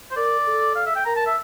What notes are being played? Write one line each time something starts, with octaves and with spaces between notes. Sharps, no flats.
C5
A#4 D5
A4
F5
E5
G5
A#4 A#5
A5
E5